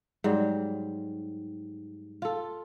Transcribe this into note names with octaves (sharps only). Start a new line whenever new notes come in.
G#2 F#3 G3
F4 A4